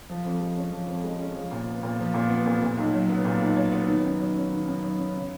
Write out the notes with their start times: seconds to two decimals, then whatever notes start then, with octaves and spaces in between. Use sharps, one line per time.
0.09 F3
0.25 F2
0.40 G#3
0.56 C#4
0.72 F3
0.88 F2
1.04 G#3
1.20 C#4
1.35 F3
1.51 A#2
1.67 B3
1.83 A#2
1.99 F3
2.14 A#2
2.30 B3
2.46 A#2
2.62 A#2
2.77 B1
2.93 F#3
3.09 B3
3.25 A#2
3.41 B1
3.56 F#3
3.72 B3
3.87 D#3
4.04 F#2
4.20 F#3
4.36 C#4
4.51 D#3
4.67 F#2
4.82 F#3
4.99 C#4
5.14 C#3